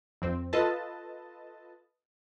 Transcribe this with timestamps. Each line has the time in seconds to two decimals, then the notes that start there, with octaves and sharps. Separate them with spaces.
0.22 F2 C4
0.53 F4 A4 B4 D#5 A5